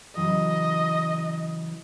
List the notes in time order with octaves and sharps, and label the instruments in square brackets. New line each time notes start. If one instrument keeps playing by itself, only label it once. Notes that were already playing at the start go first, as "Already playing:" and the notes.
[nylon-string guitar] C#3 E3 F#3 [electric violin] D#5